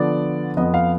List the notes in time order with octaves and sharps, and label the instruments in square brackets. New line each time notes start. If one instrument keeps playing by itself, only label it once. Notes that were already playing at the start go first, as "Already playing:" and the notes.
Already playing: [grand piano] D3 F3 B3 D5
F2 F3 B3 D#5
F5